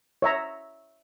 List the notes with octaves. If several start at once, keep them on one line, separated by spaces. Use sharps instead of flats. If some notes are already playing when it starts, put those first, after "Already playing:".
C#5 E5 A#5